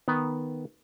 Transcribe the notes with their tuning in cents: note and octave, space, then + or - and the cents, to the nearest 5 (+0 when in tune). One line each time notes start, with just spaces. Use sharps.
D#3 +0 B3 +0